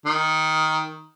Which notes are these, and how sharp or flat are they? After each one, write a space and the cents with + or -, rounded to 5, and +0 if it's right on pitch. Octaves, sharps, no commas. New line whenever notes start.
D#3 +10